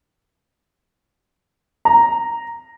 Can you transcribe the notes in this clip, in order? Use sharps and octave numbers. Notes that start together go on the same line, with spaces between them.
A#5